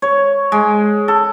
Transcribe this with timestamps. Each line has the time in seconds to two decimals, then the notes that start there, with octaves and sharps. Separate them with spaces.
0.02 C#5
0.52 G#3
1.08 A4